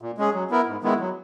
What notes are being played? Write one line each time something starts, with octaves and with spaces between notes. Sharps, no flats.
A#2
G#3 C#4 G#4
F#3
B3 E4 A#4
G#2
D#3 G#3 B3 E4
F#3